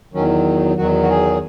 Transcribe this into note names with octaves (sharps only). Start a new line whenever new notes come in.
E2 D#3 F#3 C#4
E2 D#3 F#3 F#4
F#4
G#4